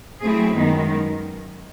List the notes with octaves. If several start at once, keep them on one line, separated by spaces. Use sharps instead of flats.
F#3 A3 C4 E4 G#4
F#2 D#3 G#3 B3 D#4